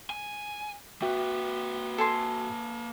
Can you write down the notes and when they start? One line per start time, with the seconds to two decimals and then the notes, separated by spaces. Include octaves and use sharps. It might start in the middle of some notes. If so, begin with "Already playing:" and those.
0.10 G#5
1.02 A#3 F#4 B4 E5 G5
1.98 A4 G#5 C6